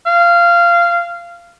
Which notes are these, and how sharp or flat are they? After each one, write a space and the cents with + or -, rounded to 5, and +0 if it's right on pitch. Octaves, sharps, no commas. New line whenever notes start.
F5 -15